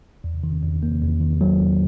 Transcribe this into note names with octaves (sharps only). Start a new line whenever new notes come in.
E2
D#3
E2
A#3
E2
D#3
F#3
E2